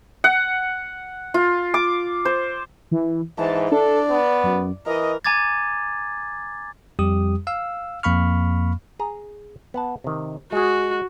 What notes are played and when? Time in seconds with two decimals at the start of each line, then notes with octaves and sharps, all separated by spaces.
0.24 F#5
1.34 F4
1.74 D6
2.25 C5
2.91 E3
3.38 G#2 E3 A5
3.71 D4 A4 D5
4.10 B3
4.43 F#2
4.86 E3 A#4 D#5
5.25 G#5 A#5 D6 G#6 A6
6.99 F2 G3 G4 D#6
7.47 F5 E6
8.03 F2 A#3 F5 B5 C#6 F6
9.00 G#4 A#5
9.74 B3 F#5 A5
10.04 C3 D#3
10.52 G#3 F#4 G#4